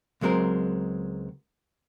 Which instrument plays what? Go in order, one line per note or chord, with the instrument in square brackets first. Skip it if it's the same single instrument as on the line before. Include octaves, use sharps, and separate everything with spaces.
[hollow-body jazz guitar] C#2 F#3 G#3 C4 A#4